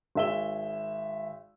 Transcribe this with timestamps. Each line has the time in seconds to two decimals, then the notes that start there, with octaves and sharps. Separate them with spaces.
0.15 G#1 G#4 E5 E6 G7